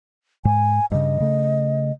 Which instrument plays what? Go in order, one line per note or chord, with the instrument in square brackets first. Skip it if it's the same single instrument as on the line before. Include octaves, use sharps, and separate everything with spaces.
[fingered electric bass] G#2 [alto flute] G#5
[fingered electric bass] G2 C#3 [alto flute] D#5
[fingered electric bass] C#3 A3